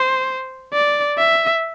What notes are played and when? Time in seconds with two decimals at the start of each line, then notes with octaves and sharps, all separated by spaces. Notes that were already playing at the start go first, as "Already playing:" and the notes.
Already playing: C5
0.73 D5
1.18 E5